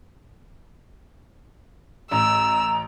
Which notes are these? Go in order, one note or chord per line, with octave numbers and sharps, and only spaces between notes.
A1 A#5 E6